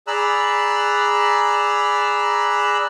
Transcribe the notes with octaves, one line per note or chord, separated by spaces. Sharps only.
G#4 D5 A#5 B5 E6 F#6